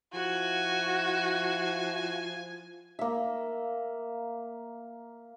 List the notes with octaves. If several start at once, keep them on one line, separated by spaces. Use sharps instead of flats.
F3 E4 F#4 G#5
A#3 E5